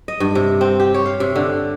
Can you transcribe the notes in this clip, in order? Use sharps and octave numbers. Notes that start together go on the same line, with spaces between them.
D#5
G2
C3
C4
G4
C#5
F5
C3
D3